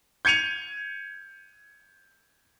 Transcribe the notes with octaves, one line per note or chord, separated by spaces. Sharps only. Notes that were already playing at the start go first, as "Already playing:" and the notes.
G6 G#6 C#7 D#7 F7